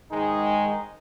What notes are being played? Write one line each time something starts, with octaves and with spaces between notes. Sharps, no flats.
G#2 D#3 G#3 D#4